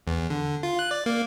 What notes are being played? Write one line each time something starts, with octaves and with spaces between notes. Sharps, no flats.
E2
D3
F4
F#6
D5
A#3